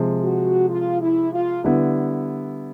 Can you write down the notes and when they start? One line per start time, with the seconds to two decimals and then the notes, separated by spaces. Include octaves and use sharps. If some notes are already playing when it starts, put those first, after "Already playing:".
Already playing: C3 F3 G#3
0.22 F#4
0.69 F4
1.00 E4
1.32 F4
1.64 D3 G3 B3 E4